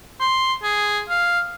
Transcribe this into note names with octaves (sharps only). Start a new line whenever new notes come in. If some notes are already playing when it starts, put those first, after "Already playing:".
C6
G#4
F5